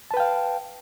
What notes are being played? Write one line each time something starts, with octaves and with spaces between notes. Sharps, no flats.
B4 F5 G5 A5